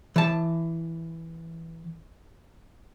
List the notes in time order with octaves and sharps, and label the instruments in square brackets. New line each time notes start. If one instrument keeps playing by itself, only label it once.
[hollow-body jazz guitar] E3 A5